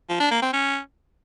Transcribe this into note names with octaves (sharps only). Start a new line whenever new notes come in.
F3
D4
A#3
C4
C#4